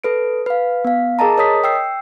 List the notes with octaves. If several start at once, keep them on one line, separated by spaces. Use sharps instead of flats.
A4 B4 D7
B4 F5
B3 F5
G#4 A#4 D#5 A5 A#5
A#4 C#5 D#5 D#6 B6
G5 E6 C7